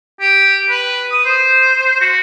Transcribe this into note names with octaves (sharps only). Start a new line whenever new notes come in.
G4
B4
D#6
C5
F#4